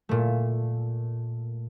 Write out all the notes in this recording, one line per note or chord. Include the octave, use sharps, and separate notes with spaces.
A#2 A3